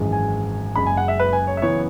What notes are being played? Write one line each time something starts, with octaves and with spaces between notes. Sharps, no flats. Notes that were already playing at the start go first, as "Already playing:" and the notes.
Already playing: G#1 F#2 E3 G#3
G#5
F#1 F#2 C#3 G#3 B5
G#5
F#5
E5
B4
G#5
C#5
E5
F#2 C#3 E3 B3 E4 C#5